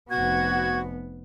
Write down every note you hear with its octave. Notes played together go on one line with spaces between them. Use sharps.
F1 B3 F#4 F#5 G#6